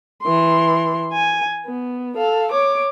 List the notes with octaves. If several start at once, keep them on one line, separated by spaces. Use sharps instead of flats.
E3 C6
G#5
B3
A4 F5
C#5 D6